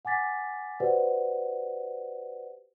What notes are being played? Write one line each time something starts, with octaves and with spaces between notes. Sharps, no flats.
F#5 G#5 D6 A6 B6
F#4 G4 B4 C5 D5 F#5